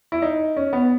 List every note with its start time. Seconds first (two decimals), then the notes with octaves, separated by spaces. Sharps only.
0.12 E4
0.22 D#4
0.57 C#4
0.73 B3